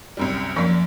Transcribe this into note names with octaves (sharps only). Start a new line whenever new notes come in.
C2 F#2 G3
F#2 F3 A#3 D5